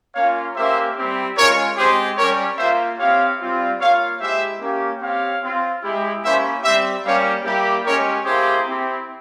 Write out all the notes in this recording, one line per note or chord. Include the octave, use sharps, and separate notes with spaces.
A#3 C#4 F4 C#5 F5
A#3 C#4 G4 C5 E5
G3 C4 E4 G4
G#3 C#4 F4 A#4 C#5
G#3 C4 G4 G#4 C5
G3 C#4 G4 A#4 C#5
A#3 F4 C5 E5
C4 E4 G4 C#5 F5
G3 C4 F4
A#3 F4 C#5 F5
G#3 E4 G4 C5 E5
A#3 C#4 G4
C4 G4 C#5 F5
C4 F4
G#3 E4 G4
A#3 C#4 E4 G4 C5 E5
G3 C4 G4 C5 E5
G3 A#3 C#4 G4 C#5 F5
G3 A#3 E4 G4
G#3 C#4 G4 A#4 C#5
A#3 E4 G4 G#4 C5
C4 E4 G4